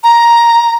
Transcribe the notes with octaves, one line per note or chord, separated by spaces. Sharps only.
A#5